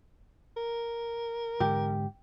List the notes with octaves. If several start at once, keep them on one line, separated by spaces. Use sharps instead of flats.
A#4
G#2 D3 G#3 G4